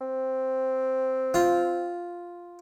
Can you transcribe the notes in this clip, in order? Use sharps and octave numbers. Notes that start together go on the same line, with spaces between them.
C4
F4